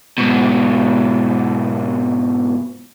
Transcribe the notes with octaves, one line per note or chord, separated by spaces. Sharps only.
G#2 B2